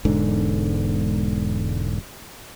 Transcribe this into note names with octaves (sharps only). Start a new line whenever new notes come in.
E1 G#2 D3